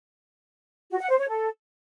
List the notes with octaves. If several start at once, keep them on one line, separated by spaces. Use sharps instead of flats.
F#4
F#5
C5
C#5
A4